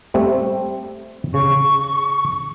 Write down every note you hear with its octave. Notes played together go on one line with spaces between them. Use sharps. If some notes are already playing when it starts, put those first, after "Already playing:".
G3 A3 C4
C#3 C#6